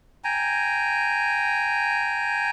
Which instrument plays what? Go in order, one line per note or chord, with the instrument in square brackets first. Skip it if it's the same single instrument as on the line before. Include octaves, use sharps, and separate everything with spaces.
[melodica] G5 G#5 A#5